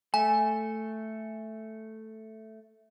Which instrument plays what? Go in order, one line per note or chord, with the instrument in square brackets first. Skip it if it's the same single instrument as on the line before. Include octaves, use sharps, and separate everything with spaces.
[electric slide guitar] A3 [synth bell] G#5